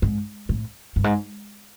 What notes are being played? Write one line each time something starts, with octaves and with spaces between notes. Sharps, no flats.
G#2
A2
G2
G#2